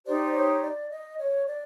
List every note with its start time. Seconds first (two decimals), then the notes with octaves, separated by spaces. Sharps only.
0.05 D#4 G4 C5 D5
0.33 C#5
0.61 D5
0.90 D#5
1.18 C#5
1.46 D5